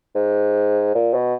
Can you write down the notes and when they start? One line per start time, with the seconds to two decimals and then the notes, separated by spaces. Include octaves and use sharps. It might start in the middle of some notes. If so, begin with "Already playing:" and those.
0.15 G#2
0.95 A#2
1.14 B2